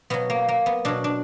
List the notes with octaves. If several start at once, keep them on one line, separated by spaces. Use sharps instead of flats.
B2 F#3 B3
A#3
A#3
B3
B2 F#3 D4
D4